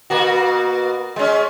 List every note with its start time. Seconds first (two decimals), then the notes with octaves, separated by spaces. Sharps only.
0.10 B2 A#3 F#4
1.16 G#3 C#4